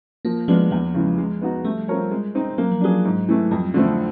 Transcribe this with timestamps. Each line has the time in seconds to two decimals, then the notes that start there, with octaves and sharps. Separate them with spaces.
0.25 F3 A#3
0.48 F3 G#3 B3 D4 F4
0.71 E2 F3
0.94 C#3 E3 G#3
1.18 G#3
1.41 B3 D#4 F#4
1.64 G3 A3
1.88 C4 F4 A#4 C#5
2.11 G#3
2.35 C4 D#4
2.58 F#3 A#3
2.71 F3
2.81 F#3 D4 F4 G#4
3.05 G#2
3.28 E3 A3
3.51 F2 G3
3.74 D3 F3 A3 C4